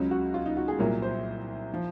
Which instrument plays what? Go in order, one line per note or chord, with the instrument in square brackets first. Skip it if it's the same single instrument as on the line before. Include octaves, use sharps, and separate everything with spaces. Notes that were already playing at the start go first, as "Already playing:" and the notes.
Already playing: [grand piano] C#2 C#3 F#3
F#4
F4
D#4
F#4
G#4
C2 A#2 F#3 A#4
C5
F3